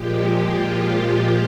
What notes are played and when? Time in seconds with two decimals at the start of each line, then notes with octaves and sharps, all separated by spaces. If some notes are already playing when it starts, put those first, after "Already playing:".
Already playing: A#2 F3 G#3 G4
0.16 G4
0.45 F4
0.74 G4
1.03 F4